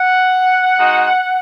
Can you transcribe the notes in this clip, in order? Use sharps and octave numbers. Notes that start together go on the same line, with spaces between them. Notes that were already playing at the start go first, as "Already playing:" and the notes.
Already playing: F#5
G#3 D#4 F#4